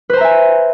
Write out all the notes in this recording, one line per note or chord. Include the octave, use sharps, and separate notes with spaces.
B4 C5 E5 G#5 A#5